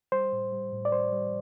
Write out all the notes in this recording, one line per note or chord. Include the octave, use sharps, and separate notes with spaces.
G3 C5
A2
G3
A2
D5
G3 C5
G3